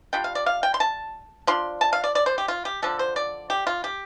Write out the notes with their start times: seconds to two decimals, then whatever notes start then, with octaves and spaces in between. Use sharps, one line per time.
0.13 G3 D4 F4 G5
0.24 F5
0.35 D5
0.46 F5
0.63 G5
0.74 C6
0.80 A5
1.47 F3 D4 F4 C6
1.81 A5
1.93 F5
2.04 D5
2.15 D5
2.26 C5
2.38 G4
2.48 F4
2.65 G4
2.82 D3 F3 D4 A4
2.99 C5
3.16 D5
3.50 G4
3.67 F4
3.84 G4